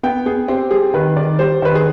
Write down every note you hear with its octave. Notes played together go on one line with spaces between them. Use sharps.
B3 G5
B3 G#4
C4 G4
G3 G#4
D#3 B4
D#3 D5
G3 C5
D#3 B4
G#4